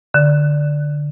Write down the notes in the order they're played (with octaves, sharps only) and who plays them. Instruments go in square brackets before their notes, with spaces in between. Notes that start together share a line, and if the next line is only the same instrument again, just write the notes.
[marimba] D3